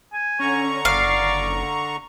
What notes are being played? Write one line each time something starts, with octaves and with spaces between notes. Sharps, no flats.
G#5
D3 C#4 A#5 C#6
F#1 D5 F5